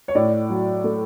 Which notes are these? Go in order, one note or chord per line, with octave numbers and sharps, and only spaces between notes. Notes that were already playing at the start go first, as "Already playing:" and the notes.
C#5
A2 D5
F#3
A3